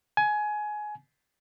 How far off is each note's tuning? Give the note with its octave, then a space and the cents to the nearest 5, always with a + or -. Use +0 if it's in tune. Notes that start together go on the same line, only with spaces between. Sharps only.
G#5 +20